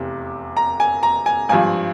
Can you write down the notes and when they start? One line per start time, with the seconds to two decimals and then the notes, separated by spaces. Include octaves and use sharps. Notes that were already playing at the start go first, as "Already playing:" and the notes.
Already playing: F1 E2 C3
0.57 A#5
0.80 G#5
1.03 A#5
1.26 G#5
1.49 G#1 G2 F3 G#5